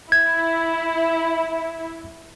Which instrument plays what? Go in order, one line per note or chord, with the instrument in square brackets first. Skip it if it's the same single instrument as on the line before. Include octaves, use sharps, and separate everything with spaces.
[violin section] E4 [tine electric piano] G#6